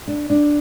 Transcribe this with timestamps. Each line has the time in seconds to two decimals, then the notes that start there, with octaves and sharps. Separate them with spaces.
0.07 D4
0.30 D4